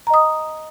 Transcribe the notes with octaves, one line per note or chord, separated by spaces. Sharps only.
D#5 A#5 D#6